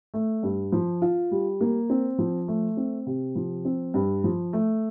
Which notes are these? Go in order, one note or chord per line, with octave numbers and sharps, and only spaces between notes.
A3
G2
F3
F4
G3
A#3
C4
F3
A3
C4
C3
F3
C4
G2
F3
A3